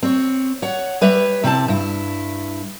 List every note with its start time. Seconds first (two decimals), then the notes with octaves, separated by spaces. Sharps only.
0.03 C4 C#5
0.62 C#5 F#5
1.01 G3 B4 C#5 E5
1.44 C3 C4 E4 A5
1.68 G2 E4